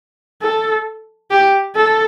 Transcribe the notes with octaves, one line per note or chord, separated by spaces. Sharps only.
A4
G4
A4